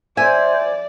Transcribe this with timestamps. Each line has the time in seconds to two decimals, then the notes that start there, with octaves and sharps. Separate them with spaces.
0.17 C5 D5 E5 G#5